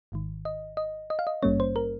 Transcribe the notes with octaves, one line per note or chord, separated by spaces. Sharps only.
G#1 G#2 D#3
D#5
D#5
D#5
F5
D#5
G#1 G2 G3 A#3 C#4 C#5
C5
A#4